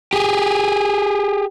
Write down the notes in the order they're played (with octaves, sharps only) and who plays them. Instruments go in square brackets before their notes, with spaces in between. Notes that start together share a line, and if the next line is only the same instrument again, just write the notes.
[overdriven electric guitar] G4 G#4